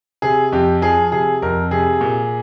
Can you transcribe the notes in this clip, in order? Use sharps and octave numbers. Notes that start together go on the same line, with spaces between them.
C3 G#4
F2 G4
F3 G#4
C3 G#4
F2 A#4
C3 G#4
A#2